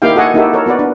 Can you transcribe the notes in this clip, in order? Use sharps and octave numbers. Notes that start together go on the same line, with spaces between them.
A#3 D#4 E4 G4 F5 G5
F#4 A4 D#5 F#5 G#5
A#3 D#4 E4 F#4 G4 A4
A4 A#4 C#5
B3 F#4 B4 D5
D4